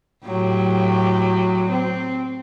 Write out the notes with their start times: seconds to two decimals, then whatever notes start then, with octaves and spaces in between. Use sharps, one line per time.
0.26 A2 F#3 G4
1.71 C4